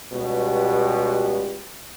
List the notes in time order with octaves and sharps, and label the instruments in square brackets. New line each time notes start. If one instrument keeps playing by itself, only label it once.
[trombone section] C#2 B2 G3 B3 G4